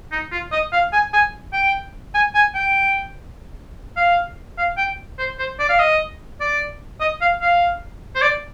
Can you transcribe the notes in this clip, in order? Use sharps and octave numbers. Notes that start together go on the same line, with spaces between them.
D#4
F4
D#5
F5
G#5
G#5
G5
G#5
G#5
G5
F5
F5
G5
C5
C5
D5
F5
D#5
D5
D#5
F5
F5
C5
D5